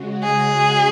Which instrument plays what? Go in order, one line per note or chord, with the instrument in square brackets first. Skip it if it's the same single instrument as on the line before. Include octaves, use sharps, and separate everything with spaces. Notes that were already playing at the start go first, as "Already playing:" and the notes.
Already playing: [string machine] C#3 G#3 F#4
[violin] G#4